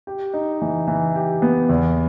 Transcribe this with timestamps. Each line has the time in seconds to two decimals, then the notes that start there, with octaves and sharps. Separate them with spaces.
0.07 G4
0.34 D#4
0.62 E3
0.88 E3
1.16 G4
1.42 B3
1.69 E2